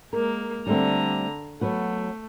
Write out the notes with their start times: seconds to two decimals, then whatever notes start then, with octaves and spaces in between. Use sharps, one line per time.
0.13 G#3 A#3 A#4
0.67 D3 G3 A3 C4 A#5
1.61 F#3 A3 B3 F#4